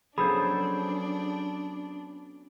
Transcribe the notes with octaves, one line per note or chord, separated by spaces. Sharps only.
F#3 B3 C#4 D4 G#4 A4 C5 B5